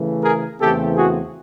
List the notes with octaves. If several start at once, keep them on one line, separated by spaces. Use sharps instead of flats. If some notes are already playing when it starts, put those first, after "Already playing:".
Already playing: C#3 E3 A3
G#4 A#4
E2 C#3 E3 A3 C4 G4 A4
F#4 G#4